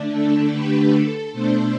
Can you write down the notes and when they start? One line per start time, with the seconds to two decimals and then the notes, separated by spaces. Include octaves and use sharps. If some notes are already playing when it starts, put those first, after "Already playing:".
Already playing: D3 A3 D4
0.12 A4
0.52 G4 B4
0.92 A4
1.32 B2 A3 D4 A4 C5